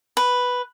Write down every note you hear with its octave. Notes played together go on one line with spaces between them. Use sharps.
B4